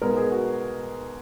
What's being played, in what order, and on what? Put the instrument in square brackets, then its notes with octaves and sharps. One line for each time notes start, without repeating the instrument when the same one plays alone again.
[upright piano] B1 B2 G#3 B3 A#4
G#4
F#4